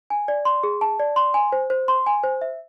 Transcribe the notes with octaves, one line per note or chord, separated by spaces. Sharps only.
G#5
D5
C6
G#4
A5
D5
C6
G#5
C5
C5
C6
G#5
C5
E5